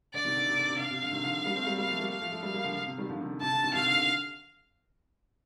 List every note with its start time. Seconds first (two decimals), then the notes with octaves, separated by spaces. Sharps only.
0.14 D3 D5
0.24 C3 D#3
0.37 D3
0.47 C3
0.58 D3
0.69 C3
0.79 D3 F5
0.91 C3
1.02 D3
1.12 C3 D#3
1.23 D3 F3
1.46 G3 A#3
1.56 A3 C4
1.67 G3 A#3
1.78 G3 A#3 F5
1.88 F3 A3
1.99 G3 A#3
2.11 F5
2.21 F3 A3
2.32 F3 A3
2.43 G3 A#3 F5
2.54 G3 A#3
2.65 D3 F3
2.77 D3
2.86 C3
2.98 D#3 G3
3.09 D3 F3
3.20 C3 D#3
3.30 D3
3.42 C3 A5
3.52 D3
3.63 C3 D#3
3.74 C3 D#3 F5
3.86 D3
3.97 D3